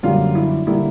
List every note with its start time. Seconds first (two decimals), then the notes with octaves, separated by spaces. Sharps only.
0.03 F#2 D3 G3 A#3 F4
0.35 E4
0.67 D3 G3 A#3 E4